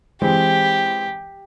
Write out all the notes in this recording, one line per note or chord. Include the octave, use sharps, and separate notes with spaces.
E3 G#3 C4 G4